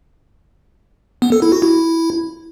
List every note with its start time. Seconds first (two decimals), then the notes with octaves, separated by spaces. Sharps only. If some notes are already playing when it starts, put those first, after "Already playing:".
1.22 B3
1.32 A4
1.42 E4
1.52 F#4
1.62 E4